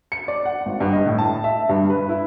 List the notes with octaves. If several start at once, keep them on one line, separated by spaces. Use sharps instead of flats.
C#7
D5
F#5
G#1
G2
D#5
A2
A5
E5
G2
B4
E4